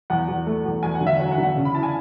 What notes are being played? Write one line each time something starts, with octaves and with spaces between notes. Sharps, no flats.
E2 F#5
E2
A3
E2
E2 G#5
F#5
D3
E5
F#3 F#5
F#5
D3
F#5
C#3
B5
E4 A5
G#5